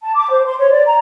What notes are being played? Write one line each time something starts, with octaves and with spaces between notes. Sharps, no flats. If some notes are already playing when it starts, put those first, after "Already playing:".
A5
D6
C5
C6
C#5
D5
A#5